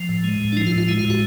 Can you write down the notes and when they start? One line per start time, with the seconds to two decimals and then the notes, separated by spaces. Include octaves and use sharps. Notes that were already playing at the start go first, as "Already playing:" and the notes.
Already playing: F3
0.09 A2
0.24 G#3
0.40 A2
0.52 D4
0.57 F3 D#4
0.67 F4
0.72 A2
0.78 F4
0.88 G#3 E4
0.99 F4
1.05 A2
1.10 F#4